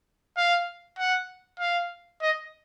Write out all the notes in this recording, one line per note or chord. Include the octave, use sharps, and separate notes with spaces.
F5
F#5
F5
D#5